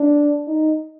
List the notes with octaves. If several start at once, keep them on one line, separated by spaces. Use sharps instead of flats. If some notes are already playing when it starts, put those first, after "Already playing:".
Already playing: D4
D#4